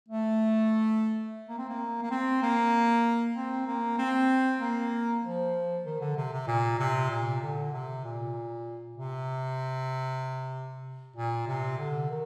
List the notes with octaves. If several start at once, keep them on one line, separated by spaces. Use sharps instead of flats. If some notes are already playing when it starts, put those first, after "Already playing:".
A3
A#3
C4
A#3
A#3
C4
A#3
C4
A#3
C4
A#3
F3
D#3
D3
C3
C3
A#2
C3
A#2
D3
C3
A#2
C3
A#2
C3
D3
D#3